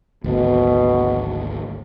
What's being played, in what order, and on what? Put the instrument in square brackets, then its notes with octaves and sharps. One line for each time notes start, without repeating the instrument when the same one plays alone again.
[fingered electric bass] G#1 D2 [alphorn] B2